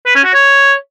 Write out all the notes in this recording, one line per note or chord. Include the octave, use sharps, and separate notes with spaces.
B4
C#4
F#4
C#5